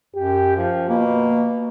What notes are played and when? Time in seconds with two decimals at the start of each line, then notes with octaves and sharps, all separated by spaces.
0.15 F#2 G4
0.57 F3
0.90 B2 A#3